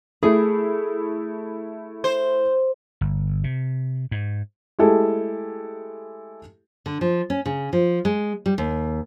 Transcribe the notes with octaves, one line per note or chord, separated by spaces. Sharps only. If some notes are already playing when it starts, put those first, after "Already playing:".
A3 E4 G#4
C5
G1
C3
G#2
G#3 A3 E4 G4 A4
D3
F3
C#4
C#3
F3
G#3
G3
D#2